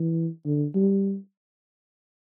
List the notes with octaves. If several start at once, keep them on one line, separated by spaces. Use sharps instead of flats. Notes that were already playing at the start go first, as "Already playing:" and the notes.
Already playing: E3
D3
G3